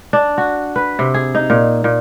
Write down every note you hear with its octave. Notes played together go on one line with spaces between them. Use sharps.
D4
F#4
B4
C3
G#4
D#4
A#2
A#2